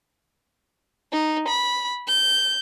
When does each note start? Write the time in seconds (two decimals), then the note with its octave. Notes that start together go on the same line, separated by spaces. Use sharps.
1.12 D#4
1.48 B5
2.07 G6